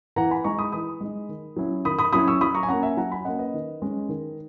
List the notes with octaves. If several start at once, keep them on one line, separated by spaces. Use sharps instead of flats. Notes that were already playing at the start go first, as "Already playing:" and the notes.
E3 F#5 A#5
G#5 B5
G#3 D#4 A#5 C#6
B5 D#6
E3 B5 D#6
G#3 D#4
D#3
F#3 C#4 E4
D#3 B5 D#6
B5 D#6
F#3 C#4 E4 B5 D#6
C#6 E6
F#3 B5 D#6
A#5 C#6
G#5
A#3 C#4 F#5 A#5
E5 G#5
F#3 F#5 A#5
G#5 B5
A#3 C#4 D#5 F#5
B4 D#5
D#3
G#3 C#4
D#3